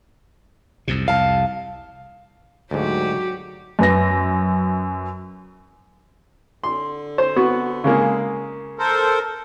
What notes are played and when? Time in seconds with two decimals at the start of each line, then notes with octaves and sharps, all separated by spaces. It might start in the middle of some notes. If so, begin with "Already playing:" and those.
0.88 C2 F2 C3
1.08 F5 A5
2.71 D2 G#2 F#3 F#4 G4
3.79 F#2 B4 A#6
6.64 D3 C6
7.18 C5
7.36 B3 F#4
7.84 C#3 G#3 A#3
8.79 A4 A#4 C5